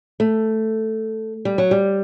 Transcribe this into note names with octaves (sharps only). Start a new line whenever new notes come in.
A3
G3
F#3
G3